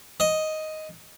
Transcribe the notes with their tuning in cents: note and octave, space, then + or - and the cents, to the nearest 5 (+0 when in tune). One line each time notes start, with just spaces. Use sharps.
D#5 +5